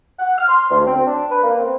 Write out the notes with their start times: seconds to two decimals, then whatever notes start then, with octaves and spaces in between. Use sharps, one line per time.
0.19 F#5
0.37 F6
0.49 C6
0.70 D2
0.86 C4
1.06 D4
1.30 B4
1.43 A#3
1.58 C4